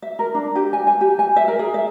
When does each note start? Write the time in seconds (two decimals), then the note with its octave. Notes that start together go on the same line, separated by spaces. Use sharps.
0.02 E5
0.19 A#4
0.35 D4
0.56 G4
0.73 G#5
0.87 G#5
1.01 G4
1.19 G#5
1.36 E5
1.48 A#4
1.59 G#4
1.74 E5